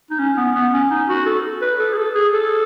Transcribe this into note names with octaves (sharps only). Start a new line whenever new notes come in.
D#4
C#4
B3
B3
C#4
D#4
F#4
A4
B4
A4
G#4
A4
G#4
A4